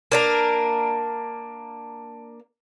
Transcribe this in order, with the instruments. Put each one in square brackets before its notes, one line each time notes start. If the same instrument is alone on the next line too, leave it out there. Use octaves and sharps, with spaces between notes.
[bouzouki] A#3 D4 A#4